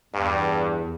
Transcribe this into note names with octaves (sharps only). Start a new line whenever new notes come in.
E2 G2